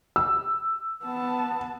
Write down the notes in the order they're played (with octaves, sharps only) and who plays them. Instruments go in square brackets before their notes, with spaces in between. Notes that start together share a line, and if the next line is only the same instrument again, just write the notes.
[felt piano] E6
[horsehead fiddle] B3 A5